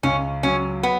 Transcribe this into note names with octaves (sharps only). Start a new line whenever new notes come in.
C#2 C#4
F#3 C#4
B3